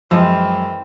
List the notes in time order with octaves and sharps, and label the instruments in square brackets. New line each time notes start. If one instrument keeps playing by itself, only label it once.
[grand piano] F#2 G#3 E6 [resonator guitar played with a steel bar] E3 [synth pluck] F3 [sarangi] C4